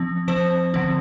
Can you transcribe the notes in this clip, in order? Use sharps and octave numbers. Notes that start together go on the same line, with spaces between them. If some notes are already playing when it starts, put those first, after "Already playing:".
Already playing: F3 C4
F3 C4 C5
D3 F3 C4